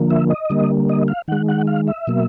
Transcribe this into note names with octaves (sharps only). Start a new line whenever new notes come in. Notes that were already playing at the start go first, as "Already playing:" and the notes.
Already playing: D3 F3 A#3
E5
D#5
D3 G3 A#3
D#5
F5
D#3 G#3 F#5
F#5
F5
E5
B2 F#3 A#3